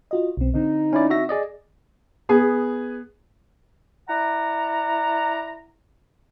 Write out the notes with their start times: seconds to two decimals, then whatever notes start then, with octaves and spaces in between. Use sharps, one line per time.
0.11 F4 F#4 D#5
0.37 B1 C4
0.54 D3 C4 D#4
0.93 C#4 E4 D5
1.10 F#4 E5 A#6
1.29 G#4 D5 D#5
2.29 B3 G#4
4.09 E4 D5 F#5 A#5